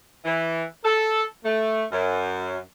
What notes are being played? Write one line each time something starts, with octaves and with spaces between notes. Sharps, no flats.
E3
A4
A3
F#2